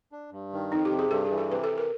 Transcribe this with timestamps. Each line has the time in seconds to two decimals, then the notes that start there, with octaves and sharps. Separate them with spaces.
0.12 D4
0.32 G2
0.53 D#3
0.71 F2 D#4
0.85 G4
0.91 C3
0.99 G#4
1.11 G2 A4
1.25 G#4
1.31 E3
1.38 A4
1.50 C3 B4
1.64 A4
1.70 E3
1.78 A#4